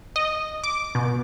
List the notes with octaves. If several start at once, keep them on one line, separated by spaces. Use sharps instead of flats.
D#5
D6
B2